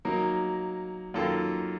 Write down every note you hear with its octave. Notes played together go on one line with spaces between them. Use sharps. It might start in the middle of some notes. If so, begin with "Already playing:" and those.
F#3 A#3 D#4 A#4
F#2 D#3 A#3 F4 A4